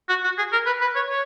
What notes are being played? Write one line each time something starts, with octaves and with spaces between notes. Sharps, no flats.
F#4
F#4
G#4
A#4
B4
B4
C#5
C#5